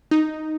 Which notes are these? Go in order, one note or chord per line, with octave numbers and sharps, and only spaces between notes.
D#4